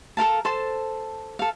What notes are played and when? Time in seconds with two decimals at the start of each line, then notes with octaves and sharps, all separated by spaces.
0.17 A4 A#4 F5 A5
0.45 A4 C5 A5
1.39 A4 F5